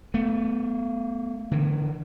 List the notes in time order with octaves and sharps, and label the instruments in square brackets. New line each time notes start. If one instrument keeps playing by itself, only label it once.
[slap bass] A3 B3
D3 E3